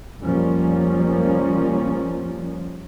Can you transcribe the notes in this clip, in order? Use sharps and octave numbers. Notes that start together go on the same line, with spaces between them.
F1 F3 G3 A#3 C#4